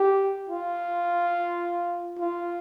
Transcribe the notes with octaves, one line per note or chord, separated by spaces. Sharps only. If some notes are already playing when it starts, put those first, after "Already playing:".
Already playing: G4
F4
F4